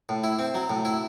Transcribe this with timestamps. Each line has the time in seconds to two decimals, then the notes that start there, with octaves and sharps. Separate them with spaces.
0.09 A2
0.24 E4
0.39 C4
0.55 F#3
0.70 A2
0.85 E4